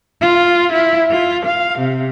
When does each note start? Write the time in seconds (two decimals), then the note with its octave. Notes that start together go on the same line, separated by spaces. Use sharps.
0.21 F4
0.72 E4
1.11 F4
1.46 F5
1.79 C3